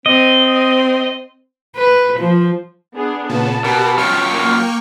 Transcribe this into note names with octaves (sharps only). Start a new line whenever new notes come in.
C4 D#5
B4
F3
B3 D4 G#4
A#2 C#3 B3 A5
B2 G4 A#4
F#2 F4 C#5 G5 C#6 F6
A#3